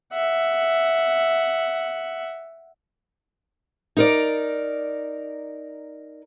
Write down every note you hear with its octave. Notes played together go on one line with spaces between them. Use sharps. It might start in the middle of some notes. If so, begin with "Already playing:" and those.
E5 F#5
D#4 A#4 D5